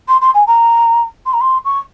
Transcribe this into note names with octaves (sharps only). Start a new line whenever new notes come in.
C6
C6
G#5
A#5
C6
A#5
C6
C#6